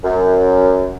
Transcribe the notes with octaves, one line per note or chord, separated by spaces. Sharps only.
F#2